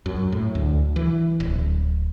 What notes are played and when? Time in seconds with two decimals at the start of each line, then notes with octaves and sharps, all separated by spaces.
0.06 F#2
0.32 A2
0.55 D2
0.96 E3
1.40 D1